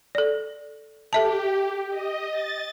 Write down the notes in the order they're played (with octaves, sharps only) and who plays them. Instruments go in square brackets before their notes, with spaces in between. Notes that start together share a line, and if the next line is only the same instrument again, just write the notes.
[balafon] A4 D5
[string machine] G4 [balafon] A4 E5 A5
[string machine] D#5
A6